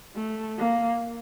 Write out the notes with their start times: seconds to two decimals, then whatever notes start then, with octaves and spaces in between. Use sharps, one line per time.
0.16 A3
0.58 A#3